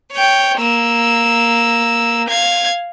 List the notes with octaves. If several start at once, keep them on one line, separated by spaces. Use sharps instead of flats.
C#5 G5
A#3 E6
F5 G#6